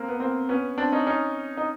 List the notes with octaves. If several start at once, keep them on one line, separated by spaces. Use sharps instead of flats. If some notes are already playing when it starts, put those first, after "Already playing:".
Already playing: A#3 C4
B3
A#3 C4
B3 C#4
C4 D4
C#4 D#4
C#4 D#4
D#4